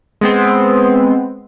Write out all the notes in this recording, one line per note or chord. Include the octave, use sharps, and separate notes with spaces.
G#3 B3 C4